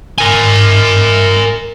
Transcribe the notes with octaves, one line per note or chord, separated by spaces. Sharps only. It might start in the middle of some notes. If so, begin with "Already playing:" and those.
A#4 G#5